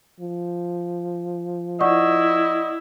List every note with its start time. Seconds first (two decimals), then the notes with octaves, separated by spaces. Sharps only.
0.20 F3
1.81 E4 D5 D#5 F#5 C#6